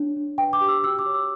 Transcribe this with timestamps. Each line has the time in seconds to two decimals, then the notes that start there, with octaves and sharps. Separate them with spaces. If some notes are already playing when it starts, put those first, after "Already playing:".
Already playing: D4 C#5
0.16 D4
0.38 B4 G5
0.53 D6
0.61 G4
0.68 E6
0.83 F#4 E6
0.99 D6
1.06 C#5
1.14 E6